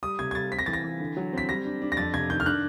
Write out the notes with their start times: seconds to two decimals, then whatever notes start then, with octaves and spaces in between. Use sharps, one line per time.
0.03 G3 D#6
0.19 C3 G#6
0.31 G#6
0.35 G3 A6
0.51 C4 B6
0.59 A#6
0.66 E3 A6
0.73 A#6
0.84 E3
1.00 D3
1.17 F#3
1.33 C4 B6
1.49 G3 A#6
1.65 D4
1.82 D4
1.92 A#6
1.97 F2 A6
2.14 C3 G#6
2.30 D#3 G6
2.40 F6
2.46 D4 F#6